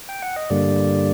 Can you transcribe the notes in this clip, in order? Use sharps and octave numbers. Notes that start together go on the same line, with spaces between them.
G5
F#5
D#5
G2 D3 G3 A#3 D5